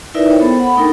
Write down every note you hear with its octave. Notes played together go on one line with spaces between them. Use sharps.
D#4 E4 A#4 B4 D5 E5
A#4 C5 C#5 G5
B3 A4 C5
F#5 B5
A3 D4 D#4 A4 A#4 G5